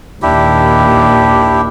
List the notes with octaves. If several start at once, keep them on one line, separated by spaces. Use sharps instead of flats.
A#1 D#2 D4 E4 G4